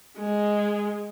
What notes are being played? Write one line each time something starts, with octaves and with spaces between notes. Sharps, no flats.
G#3